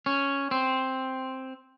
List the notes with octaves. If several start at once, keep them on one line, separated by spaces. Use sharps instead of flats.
C#4
C4